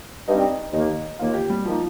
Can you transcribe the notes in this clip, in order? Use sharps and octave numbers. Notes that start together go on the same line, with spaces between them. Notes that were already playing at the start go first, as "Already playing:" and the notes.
G2 G3 C4 D#4
D#2 D#3 A#3 D#4
D#2 D#3 A#3 F4
G4
G3
D#3 F3 A#3 D#4